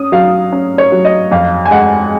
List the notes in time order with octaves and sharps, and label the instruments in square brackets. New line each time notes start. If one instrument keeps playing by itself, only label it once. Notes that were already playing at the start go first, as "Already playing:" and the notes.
Already playing: [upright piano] C#4 D#6
F#3 F5
C#4
C#5
F#3
D#5
F2 F5
G#5
G#3 F#5